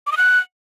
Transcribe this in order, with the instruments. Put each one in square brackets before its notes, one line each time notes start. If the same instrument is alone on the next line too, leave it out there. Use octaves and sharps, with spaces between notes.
[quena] D6
D#6
F#6